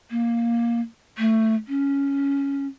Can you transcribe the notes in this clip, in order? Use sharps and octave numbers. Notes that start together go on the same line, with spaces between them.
A#3
A3
C#4